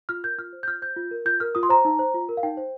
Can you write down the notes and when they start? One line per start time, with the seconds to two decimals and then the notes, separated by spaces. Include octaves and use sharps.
0.09 F4 F6
0.24 A#4 G6
0.38 F4 F6
0.53 C5
0.63 G6
0.68 F4 F6
0.82 C5 G6
0.96 F4
1.11 A#4
1.26 F4 G6
1.40 A#4 F6
1.55 F4 D#6
1.63 C6
1.69 C5 A#5
1.85 D#4
1.99 C5
2.14 F4
2.29 A#4
2.37 F5
2.43 D#4 G5
2.57 C5